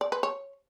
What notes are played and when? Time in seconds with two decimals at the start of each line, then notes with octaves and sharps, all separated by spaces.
0.01 D5
0.12 B4
0.23 C#5